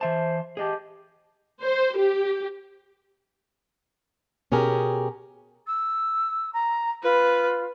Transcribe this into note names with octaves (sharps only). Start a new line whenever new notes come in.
E3 C5 E5 A5
G4 G#4 D#5 A5
C5
G4
B2 C#4 G4 G#4 A#4
E6
A#5
F4 B4